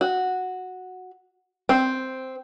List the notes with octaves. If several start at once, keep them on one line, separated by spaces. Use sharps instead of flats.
F#4
C4